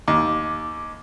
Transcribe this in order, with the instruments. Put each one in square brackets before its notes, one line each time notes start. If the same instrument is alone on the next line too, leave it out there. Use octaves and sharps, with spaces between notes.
[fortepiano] D#2 [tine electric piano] D6